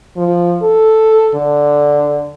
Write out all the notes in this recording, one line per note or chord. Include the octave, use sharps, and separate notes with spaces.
F3
A4
D3